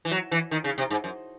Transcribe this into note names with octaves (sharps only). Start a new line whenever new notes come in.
E3
F#3
E3
D#3
C#3
C3
G#2
F#2